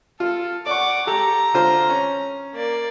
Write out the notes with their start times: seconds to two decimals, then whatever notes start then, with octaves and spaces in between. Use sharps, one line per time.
0.20 F4 A4
0.67 D5 F#5 C#6 D6
1.07 G4 A4 A#5
1.54 D3 F4 C5
1.89 C#4
2.54 A#3 D5